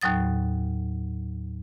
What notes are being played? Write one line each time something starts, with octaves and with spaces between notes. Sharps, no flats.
D#2 A2 F#3 D#6 A6